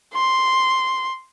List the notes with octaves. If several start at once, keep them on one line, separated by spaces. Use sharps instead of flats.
C6